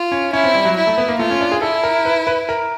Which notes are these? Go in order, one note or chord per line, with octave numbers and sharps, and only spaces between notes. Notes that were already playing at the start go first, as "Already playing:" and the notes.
Already playing: F4
C#4
C#4 E4
C4
G3
F#3
E4
A3
B3
A#3
A3 F4
C#4
D4
G#4
E4 A4
A#4
B4
B4
A#4